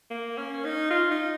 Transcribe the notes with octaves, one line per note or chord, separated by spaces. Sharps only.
A#3
C#4
D#4
F4
D#4